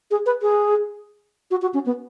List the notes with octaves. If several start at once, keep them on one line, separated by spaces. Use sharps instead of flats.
G#4
B4
G#4
F#4
F#4
C#4
B3